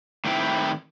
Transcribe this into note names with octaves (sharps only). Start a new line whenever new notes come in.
A2 D#3 C4 E4 G5